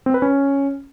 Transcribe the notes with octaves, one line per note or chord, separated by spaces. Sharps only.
C4
B4
C#4